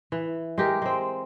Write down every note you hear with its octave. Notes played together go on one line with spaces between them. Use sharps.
E3
G#3 G4 A#4
G#3 C4